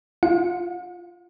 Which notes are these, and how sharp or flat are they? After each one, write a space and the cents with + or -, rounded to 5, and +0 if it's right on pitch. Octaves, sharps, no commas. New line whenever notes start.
F4 -5 F#5 -45